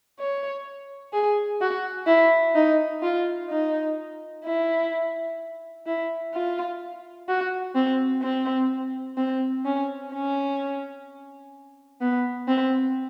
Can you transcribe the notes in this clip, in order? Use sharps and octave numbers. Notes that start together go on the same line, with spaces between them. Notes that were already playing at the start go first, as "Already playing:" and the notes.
C#5
G#4
F#4
E4
D#4
F4
D#4
E4
E4
F4
F#4
C4
C4
C4
C#4
C#4
B3
C4